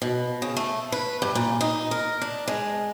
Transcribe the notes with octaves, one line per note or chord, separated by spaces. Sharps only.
B2
C#3
A3
B4
G2
A#2
D#4
A#4
D4
G#3